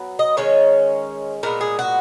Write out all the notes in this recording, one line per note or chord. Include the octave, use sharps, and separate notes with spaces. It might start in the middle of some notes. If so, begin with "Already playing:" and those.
Already playing: F#3 B3
D#5
D#3 G#3 C#4 C#5
A#2 G#3 B3 A#4
G#4
F#4